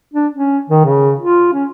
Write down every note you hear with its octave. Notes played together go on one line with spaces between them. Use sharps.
D4
C#4
D#3
C#3
F4
C#4